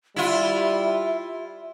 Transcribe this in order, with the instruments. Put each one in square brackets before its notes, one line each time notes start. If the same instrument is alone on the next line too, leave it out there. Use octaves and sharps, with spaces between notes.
[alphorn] G3 [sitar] E4 F4 [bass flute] E5